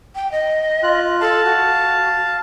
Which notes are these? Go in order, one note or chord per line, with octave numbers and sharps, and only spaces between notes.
G5
D#5
F4 F#6
A4 F5 A5
F#4